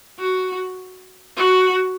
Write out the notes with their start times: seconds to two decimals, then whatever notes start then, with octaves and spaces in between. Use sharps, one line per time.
0.19 F#4
1.37 F#4